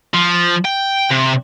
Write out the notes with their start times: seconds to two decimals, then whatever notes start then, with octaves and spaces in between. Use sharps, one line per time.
0.14 F3
0.65 G5
1.11 C3